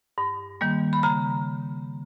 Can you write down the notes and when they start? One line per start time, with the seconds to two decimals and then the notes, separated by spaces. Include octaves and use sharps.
0.18 G2
0.61 D#3 G3 A#3
0.93 B5
1.03 C#3 A#5